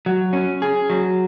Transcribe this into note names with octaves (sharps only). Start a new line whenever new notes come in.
F#3
C#4
G#4
F#3